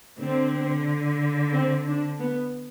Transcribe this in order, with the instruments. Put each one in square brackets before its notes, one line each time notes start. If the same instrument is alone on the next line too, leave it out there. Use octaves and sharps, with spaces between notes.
[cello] D3 [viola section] C4
[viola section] C4
D4
B3